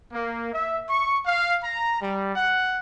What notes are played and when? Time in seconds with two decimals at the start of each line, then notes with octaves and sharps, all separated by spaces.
0.13 A#3
0.52 E5
0.89 C#6
1.26 F5
1.63 A#5
2.01 G3
2.34 F#5